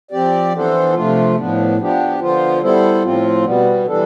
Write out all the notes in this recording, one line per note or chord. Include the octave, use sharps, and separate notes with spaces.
F3 C4 G4 D5
E3 B3 D4 A4 C5
C3 F3 A3 D4 F4
A2 F3 B3 D4
F3 B3 D4 G4
D3 F3 B3 F4 C5
G3 B3 E4 A4 C5
A2 F3 C4 F4
B2 G3 B3
E3 G3 D4 A4